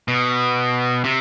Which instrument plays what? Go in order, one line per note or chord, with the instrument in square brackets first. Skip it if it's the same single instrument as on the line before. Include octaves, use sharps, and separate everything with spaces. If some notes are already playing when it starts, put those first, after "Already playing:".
[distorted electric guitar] B2
C3